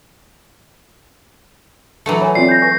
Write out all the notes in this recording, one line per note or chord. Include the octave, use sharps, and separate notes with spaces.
E3 F#3 A3 C#7
C#5 G#5 B5
C4 F4 D5 C7
G6 A#6
B4 G#5 C#6